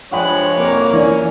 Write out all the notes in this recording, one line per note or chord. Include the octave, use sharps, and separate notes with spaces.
G2 F3 G#3 C#5 F#5 G5 B5 F#6
C2 F2 A#3 A#5 D6
E3 C#4 D4